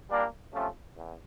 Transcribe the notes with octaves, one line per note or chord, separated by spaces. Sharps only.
A#2 G3 A#3 D4
C3 F3 A3 C#4 F4
E2